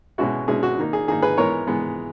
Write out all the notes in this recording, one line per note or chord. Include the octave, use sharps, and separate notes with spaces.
B2 G#3 C#4 E4 F#4
B2 G#3 C#4 E4 G#4
F#4
D#3 A#3 D#4
G#4
D#3 A#3 D#4 G#4
G#4 B4
E3 G#3 B3 A#4 C#5
E3 G#3 B3